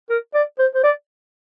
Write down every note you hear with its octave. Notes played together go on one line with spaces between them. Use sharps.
A#4
D5
C5
C5
D5